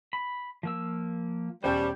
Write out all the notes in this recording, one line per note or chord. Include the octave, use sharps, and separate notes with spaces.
B5
F3 A#3 E6
E1 G3 C#4 C5 A5 C#6 G6